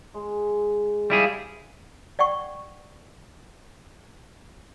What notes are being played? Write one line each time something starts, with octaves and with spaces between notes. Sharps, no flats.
G#3
G3 E4 F4 G#4
D5 F#5 G5 C#6